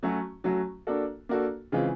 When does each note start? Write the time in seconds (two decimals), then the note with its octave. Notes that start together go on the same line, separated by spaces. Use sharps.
0.03 F#3 A3 C#4 F#4
0.44 F#3 A3 C#4 F#4
0.87 A#3 D4 F#4 A4
1.29 A#3 D4 F#4 A4
1.72 C#3 E3 G#3 C4 F4